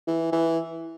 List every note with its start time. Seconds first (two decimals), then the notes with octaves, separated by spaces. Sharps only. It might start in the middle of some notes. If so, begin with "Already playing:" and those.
0.07 E3
0.32 E3